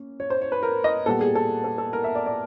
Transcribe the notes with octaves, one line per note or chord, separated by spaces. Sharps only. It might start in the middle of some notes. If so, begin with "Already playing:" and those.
Already playing: A#3 C#4
C#5
C5
C#5
B4
A#4
D#5
A#2 G3 B3 A4
G#4
A4
A4
A4
A#4
E5
D5
D5